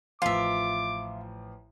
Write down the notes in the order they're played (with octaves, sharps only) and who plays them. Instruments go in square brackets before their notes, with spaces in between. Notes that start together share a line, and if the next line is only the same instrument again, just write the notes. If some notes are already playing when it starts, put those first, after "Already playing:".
[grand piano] A1 F3 [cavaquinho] F4 E5 [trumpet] D6